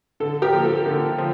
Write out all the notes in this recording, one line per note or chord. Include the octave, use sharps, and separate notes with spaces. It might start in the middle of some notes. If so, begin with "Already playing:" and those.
D3 A4
G4 A#4
F3 A#3
A4
D3
F3